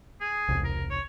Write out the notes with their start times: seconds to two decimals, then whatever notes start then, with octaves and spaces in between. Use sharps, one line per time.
0.21 G#4
0.49 E1 C2
0.64 A#4
0.90 C#5